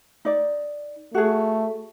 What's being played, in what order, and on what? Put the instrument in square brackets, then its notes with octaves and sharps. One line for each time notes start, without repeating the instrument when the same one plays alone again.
[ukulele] D#4 D5
[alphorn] A3 [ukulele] F#4 G#4